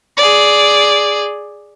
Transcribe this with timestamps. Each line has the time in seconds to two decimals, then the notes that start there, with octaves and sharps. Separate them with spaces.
0.17 G#4 D5